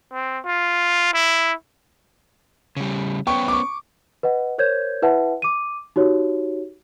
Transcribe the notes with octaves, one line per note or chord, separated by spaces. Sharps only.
C4
F4
E4
C#3 G3
B3 C#4 G5 C#6
C#6 D6
B4 D#5 F#5
A#4 C5 C#5 G6 G#6
E4 B4 E5 F#5 A5
D6 D#7
D#4 F#4 G4 C#5